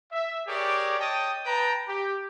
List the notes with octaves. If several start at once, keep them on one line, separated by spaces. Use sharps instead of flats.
E5
G4 G#4 A#4 C#5 D5
C#5 D#5 G5 A5 D#6
B4 G5 A5 A#5
G4